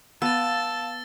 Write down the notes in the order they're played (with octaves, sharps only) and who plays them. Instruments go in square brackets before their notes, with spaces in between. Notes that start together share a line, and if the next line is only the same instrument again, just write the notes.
[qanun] B3 [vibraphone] F5 [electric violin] A5 [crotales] E6 A6